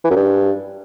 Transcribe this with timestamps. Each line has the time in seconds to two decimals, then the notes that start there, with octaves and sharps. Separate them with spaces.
0.04 E3
0.10 F#2
0.16 G2